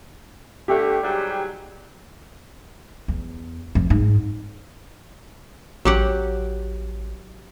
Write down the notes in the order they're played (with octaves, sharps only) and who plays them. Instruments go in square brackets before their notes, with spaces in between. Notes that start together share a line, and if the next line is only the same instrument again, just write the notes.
[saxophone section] D3 A3 [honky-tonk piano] G4
[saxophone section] G#2 F#3 G3
[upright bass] E2
F2
G#2
[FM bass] A1 [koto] F#3 G4 F#5